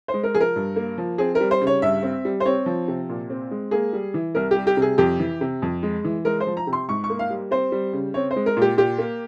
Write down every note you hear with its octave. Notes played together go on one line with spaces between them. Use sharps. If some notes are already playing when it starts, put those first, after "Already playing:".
C5
G#3
A#4
F3 G#4
A#4
G2
A#3
F3
C4 G#4
A#4
G3
C5
C#3
C#5
G2 E5
C4
G3
C5
C4 C#5
F3
C3
A#2
C4
G#3
A#3 G#4
G3
E3
C2 A#4
G3 G4
G4
C3
G#4
F2 G4
E3
C3
F2
G#3
E3
G#3 A#4
C5
F3
A#5
C3
C6
G#2 C#6
C#6
A#3
F5
G3
C4 C5
G3
C#3
C4 C#5
C5
G#3
A#4
A#2 G4
A#2 G4
A#3